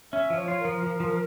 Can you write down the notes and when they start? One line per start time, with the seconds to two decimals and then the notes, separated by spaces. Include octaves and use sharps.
0.12 C#4 E5
0.30 F3
0.36 C#5
0.48 F4 C#5
0.60 A#4
0.65 F3
0.83 F3
1.00 F3